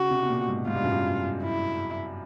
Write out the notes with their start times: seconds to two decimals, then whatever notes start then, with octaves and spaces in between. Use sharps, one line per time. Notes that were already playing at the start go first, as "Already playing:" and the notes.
Already playing: C#3 F#4
0.11 C3
0.23 B2
0.29 A#2
0.48 G#2
0.67 G#2 F4
0.75 G2
0.83 F#2
0.91 G2
1.42 E4